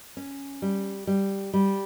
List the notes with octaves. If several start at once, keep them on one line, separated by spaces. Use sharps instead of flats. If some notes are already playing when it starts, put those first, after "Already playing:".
C#4
G3
G3
G3